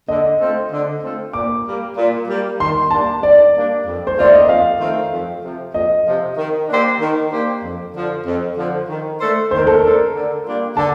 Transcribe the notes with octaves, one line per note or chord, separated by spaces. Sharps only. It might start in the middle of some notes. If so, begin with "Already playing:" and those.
D3 D#5
A3 C4 F4 A4
D3
A3 C4 F4 A4
A#2 D6
G3 A#3
A#2
G3 A#3
D#3 C6
G3 A#3 D4 A5
D#3 D5
G3 A#3 D4
F2
C5
D#3 A3 C4 F4 D5
D#5
F2 F5
D#3 A3 C4 F4
F2
C3 F3
F2 D#5
C3 F3
D#3
A#3 D4 G4 C5
D#3
A#3 D4 G4 C5
F2
D3 F3
F2
D3 F3
D#3
A3 D4 A4 C5
D#3 C5
A#4
A4
A#4
A3 D4 A4 C5
D3
G3 A#3 D4 F4
D3 A5